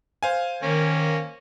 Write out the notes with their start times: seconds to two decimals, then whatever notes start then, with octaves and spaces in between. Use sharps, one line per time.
0.23 C5 F5 G#5
0.63 D#3 A#3 C#4